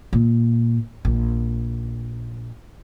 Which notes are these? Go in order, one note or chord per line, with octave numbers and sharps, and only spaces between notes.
A#2
A#1